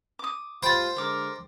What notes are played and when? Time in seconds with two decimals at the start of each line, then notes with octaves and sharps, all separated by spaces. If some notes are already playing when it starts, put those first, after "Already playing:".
0.19 D6 D#6
0.63 G3 A3 F4 C5 G5 B5 A6
0.96 D3 G#3 A#4 D5 D6